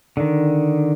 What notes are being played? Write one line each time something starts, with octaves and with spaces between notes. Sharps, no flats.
D3 D#3